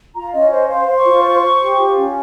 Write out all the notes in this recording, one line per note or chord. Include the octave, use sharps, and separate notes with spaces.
F4 A#5
C#4 D#5
C5 D#5
C5 F5
C5
C#6
F4
C5
C5
G4
F4
C#4